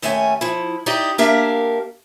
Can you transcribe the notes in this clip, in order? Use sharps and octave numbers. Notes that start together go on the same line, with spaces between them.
D#2 A3 C#4 E5 G5 G#5
F3 E4
D#4 E4 G4 D5 D#5
A#3 D4 G4 A#4 E5 F5